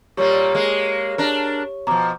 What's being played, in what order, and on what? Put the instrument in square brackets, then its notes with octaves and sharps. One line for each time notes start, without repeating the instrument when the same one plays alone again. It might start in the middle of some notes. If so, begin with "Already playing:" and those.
[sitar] A#2 G3 A#3 [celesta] G4 C#5 C#6
[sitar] G#3 A#3
D4 A#4
[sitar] B2 F3 [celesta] A#5 D6